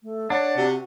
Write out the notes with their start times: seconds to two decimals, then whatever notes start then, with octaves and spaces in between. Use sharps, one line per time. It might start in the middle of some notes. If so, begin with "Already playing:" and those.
0.03 A3
0.30 D4 C#5 F#5
0.56 C3 F#4